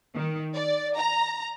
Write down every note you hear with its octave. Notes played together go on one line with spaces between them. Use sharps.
D#3
D5
A#5